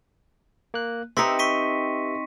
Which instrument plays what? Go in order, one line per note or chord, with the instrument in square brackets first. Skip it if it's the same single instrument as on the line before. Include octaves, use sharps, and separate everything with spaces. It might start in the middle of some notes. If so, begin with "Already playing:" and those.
[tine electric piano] A#3 F#6
[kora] C4 D#4 [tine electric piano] G4 B4 E5 [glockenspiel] C6 A#6 C#7
[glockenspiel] C#6 B6 D#7